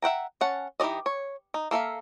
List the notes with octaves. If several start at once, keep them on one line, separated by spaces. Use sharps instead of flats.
E5 F#5 G5 A#5
C#4 F#5 A5
E3 D#4 G4 D5 D#5
C#5
D#4
A#3 A4 E5 F5